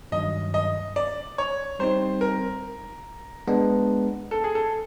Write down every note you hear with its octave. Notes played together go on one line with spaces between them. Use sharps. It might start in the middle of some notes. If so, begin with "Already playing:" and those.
G2 D#3 F#3 D#5
D#5
D5
C#5
G3 C4 D#4 C5
A#4
G#3 B3 D4
A4
G#4
A4